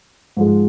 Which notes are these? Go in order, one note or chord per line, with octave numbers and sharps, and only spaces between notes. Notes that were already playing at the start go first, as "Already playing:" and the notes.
G#2 F3 G#3